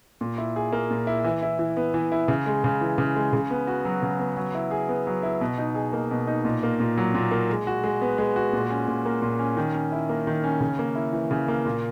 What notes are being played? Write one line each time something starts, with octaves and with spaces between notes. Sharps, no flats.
A#2
E4
G#4
A#3
A#2
E4
E3
E4
E3
B3
E3
E4
C#3
G#3
C#3
E3
C#3
G#3
C#3
B3
F#4
F#3
C#3
B3
F#3
E4
G#4
B3
F#3
E4
B2
D#4
G#4
A#3
B2
D#4
A#2
A#3
A#2
F#3
A#2
A#3
G#3
F#4
G#3
B3
G#3
F#4
A#2
C#4
A#2
A#3
A#2
C#4
D#3
C#4
E4
A#3
D#3
C#4
C#3
A#3
E4
E3
C#3
A#3
A#2